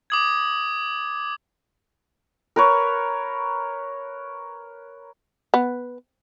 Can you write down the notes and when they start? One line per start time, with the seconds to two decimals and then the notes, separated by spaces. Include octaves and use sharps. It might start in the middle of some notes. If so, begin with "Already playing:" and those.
0.10 D6 D#6 G#6
2.56 A#4 B4 C#5
5.54 B3